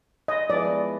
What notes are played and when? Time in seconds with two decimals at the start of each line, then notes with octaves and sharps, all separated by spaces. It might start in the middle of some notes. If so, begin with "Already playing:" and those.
0.28 D#5
0.49 F3 G#3 B3 E4 D5